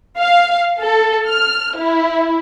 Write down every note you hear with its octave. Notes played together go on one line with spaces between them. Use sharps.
F5
A4
F6
E4